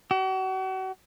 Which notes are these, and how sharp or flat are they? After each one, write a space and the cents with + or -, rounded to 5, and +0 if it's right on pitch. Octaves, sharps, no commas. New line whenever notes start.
F#4 +40